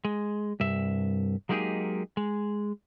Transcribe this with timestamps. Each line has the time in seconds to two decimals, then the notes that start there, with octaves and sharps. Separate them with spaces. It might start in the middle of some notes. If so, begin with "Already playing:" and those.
0.05 G#3
0.60 C2 G2 E5
1.49 F#3 G#3 A#3 D#4 G4 G#4
2.17 G#3